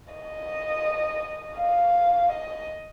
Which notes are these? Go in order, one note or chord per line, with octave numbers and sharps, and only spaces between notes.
D#5
F5
D#5